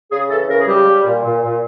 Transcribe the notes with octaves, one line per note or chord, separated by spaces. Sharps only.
C#3 G#4
E3 A4
C#3 A#4
G#4
G3 G4
G3
A#2
A#2
A#2